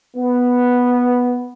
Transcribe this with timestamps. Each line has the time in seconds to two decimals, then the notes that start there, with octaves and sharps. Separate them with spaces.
0.16 B3